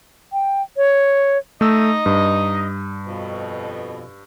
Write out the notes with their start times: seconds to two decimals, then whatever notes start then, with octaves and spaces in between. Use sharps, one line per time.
0.33 G5
0.77 C#5
1.61 A3 D#4 D#5 E6
2.06 G2
3.06 F2 B2